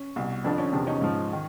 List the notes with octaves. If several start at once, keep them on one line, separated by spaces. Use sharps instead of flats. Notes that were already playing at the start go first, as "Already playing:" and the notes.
Already playing: C#4
C2 B2
F2 D3 F3 D4
C#4
E2 C3 F3 D4
C#4 D#4
G#2 F3
D#3